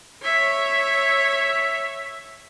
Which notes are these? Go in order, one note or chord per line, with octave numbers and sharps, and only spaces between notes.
C#5 E5